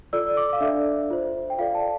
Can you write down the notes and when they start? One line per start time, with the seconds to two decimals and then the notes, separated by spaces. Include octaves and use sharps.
0.13 F4 A4 D5 E6
0.37 D6
0.53 F5
0.61 D4 A4 D5 E5
1.10 F4 C5
1.50 G5
1.59 F4 A4 D5 F5
1.75 A5